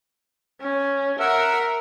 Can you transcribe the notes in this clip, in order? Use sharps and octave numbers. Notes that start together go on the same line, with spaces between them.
C#4
A#4 E5 F#5 E6